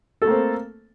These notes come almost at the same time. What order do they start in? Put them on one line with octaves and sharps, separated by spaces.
A4 A3 A#3 C4